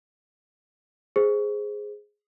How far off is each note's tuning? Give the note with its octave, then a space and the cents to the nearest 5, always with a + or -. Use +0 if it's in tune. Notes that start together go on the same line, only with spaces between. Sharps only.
G#4 +0 C5 +0